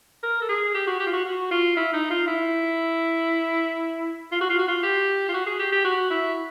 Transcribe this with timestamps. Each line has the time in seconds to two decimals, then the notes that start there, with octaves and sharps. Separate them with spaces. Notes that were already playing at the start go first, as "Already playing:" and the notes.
0.23 A#4
0.41 A4
0.49 G#4
0.74 G4
0.87 F#4
1.00 G4
1.06 F4
1.13 F#4
1.26 F#4
1.51 F4
1.77 E4
1.93 D#4
2.10 F4
2.27 E4
4.32 F4
4.41 F#4
4.50 F4
4.59 F#4
4.68 F4
4.83 G4
5.29 F4
5.34 F#4
5.46 G#4
5.59 G4
5.72 G4
5.84 F#4
6.10 E4